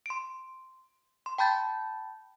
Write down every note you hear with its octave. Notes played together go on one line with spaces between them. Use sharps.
C6 D7
C6
G5 A5 B5 G6 A6